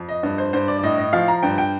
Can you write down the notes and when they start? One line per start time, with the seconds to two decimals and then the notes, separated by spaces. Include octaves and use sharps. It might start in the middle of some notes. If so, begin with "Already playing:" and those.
Already playing: F2
0.09 D#5
0.23 G2 D#5
0.38 C5
0.53 G2 C5
0.68 D5
0.78 D5
0.83 A2 D#5
0.98 D#5
1.13 F3 F5
1.28 A#5
1.43 G2 G5
1.58 G5